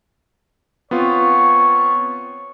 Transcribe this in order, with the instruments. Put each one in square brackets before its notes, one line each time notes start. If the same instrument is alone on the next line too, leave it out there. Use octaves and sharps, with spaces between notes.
[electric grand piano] B3 C4 F4 [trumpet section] C#5 C#6